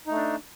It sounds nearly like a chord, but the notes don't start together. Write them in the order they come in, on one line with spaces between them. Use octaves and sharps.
D#4 A3 D4